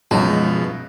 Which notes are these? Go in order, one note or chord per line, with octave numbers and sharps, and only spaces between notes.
F#2 B2 F3 F#3 G#3 D#4